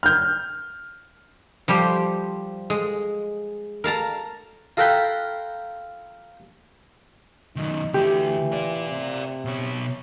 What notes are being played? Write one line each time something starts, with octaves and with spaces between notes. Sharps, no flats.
F6 G6
F3 G3 G4 C5
G#3
A#4 F5 A5 A#5
F4 A4 A#4 F#5 G5 B5
F#2 D#3 D#4
D3 E3 A3 G4
A#4 D5
C3
B2 C#5